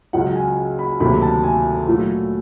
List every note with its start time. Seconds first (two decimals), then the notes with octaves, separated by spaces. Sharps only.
0.13 C#2 C#3 F#3 F#5
0.35 G#5
0.79 B5
1.00 D2 C3 D#3 F#3 A#3 B5
1.22 A5
1.43 G#5
1.87 A#2 F#3 A3